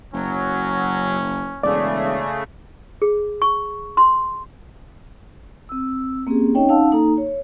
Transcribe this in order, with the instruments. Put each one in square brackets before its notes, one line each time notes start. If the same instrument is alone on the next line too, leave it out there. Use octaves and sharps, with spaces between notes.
[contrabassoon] F#1 [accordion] F#3 [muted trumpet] C#4
[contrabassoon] E1 [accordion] C#3 A3 [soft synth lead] D5
[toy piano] G#4
C#6
C6
[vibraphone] C4 E6
A#3 C4 C#4 G4 G#4
C4 C#4 D#4 C#5 D#5 G5
C#4 D#4 F5 F#5 A5 E6
A#3 D#4 A4 A#5
C#5